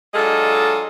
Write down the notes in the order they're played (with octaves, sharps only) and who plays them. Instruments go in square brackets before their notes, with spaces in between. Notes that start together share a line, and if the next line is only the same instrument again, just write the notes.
[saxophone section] F#3 G#3 D4 F4 A4 D#5